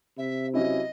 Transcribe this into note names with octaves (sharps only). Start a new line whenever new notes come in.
C3 E5
F#3 C#4 E4 D#5